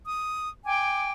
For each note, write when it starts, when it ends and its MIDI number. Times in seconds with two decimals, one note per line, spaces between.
0.07 0.49 87
0.65 1.12 79
0.65 1.12 80
0.65 1.12 86